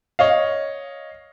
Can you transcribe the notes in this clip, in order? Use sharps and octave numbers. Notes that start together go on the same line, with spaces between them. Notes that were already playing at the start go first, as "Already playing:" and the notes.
C#5 D#5 F5